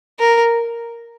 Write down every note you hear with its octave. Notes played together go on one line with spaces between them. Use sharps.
A#4